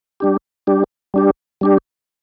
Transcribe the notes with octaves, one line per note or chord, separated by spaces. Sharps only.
G3 D4 G4
G3 D4 G4
G3 D4 G4
G3 D4 G4